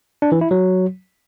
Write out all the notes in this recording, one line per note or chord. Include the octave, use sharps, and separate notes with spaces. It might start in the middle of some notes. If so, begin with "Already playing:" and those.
D4
E3
E4
F#3